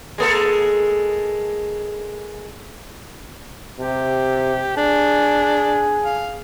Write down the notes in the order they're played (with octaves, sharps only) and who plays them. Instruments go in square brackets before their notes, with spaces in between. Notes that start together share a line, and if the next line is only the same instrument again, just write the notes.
[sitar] G#3 A#3 A4
[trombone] C3 [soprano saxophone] G4
[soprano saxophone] D4 [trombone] G#4
[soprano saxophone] F5